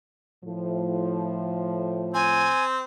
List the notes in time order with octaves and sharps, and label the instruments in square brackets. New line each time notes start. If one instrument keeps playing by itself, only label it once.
[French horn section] A2 F3
[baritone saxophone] C4 [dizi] G#5